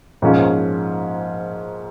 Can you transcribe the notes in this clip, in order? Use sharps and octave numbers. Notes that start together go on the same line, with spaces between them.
G#2 F3 A#3 C#4